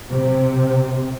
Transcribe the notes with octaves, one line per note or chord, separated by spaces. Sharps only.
C3